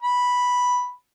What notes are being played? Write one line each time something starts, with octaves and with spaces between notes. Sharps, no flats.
B5